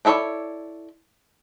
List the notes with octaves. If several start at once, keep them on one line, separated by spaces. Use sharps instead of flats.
D4 E4 A4 C#5 D5